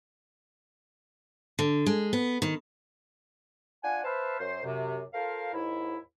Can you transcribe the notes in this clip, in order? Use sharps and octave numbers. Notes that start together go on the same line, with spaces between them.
D3
G#3
B3
D#3
D4 F4 F#5 G#5
B4 C5 E5 F5 A5
F#2 C5
F#2 C3
F4 A4 A#4 C5 F5
D#2 G#2 E4